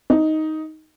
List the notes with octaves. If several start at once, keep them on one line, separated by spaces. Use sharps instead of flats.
D#4